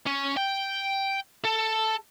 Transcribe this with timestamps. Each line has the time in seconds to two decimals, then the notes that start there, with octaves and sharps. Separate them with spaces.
0.06 C#4
0.37 G5
1.44 A4